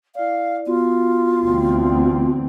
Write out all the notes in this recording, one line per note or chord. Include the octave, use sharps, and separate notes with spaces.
E4 D5 F5
B3 F4 F#4
D2 E3 C4